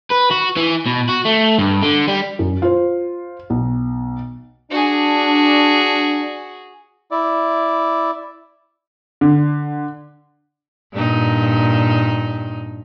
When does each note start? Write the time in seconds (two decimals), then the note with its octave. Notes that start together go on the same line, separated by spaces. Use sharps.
0.10 B4
0.31 F#4
0.56 E3
0.86 B2
1.08 F#4
1.25 A3
1.59 G2
1.82 D3
2.08 G3
2.39 F#2
2.62 F4 C5
3.50 B1
4.71 D4 F#4 G#4
7.11 E4 D5
9.21 D3
10.93 G2 A#2 D#4